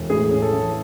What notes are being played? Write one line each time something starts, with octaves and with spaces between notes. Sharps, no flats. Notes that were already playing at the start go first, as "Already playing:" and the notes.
Already playing: E1
A2 G#4
C#4
A4
A1